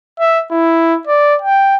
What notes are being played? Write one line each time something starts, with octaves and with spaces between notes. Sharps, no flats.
E5
E4
D5
G5